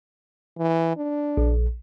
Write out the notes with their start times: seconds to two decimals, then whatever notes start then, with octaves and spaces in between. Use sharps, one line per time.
0.58 E3
0.97 D4
1.37 A#1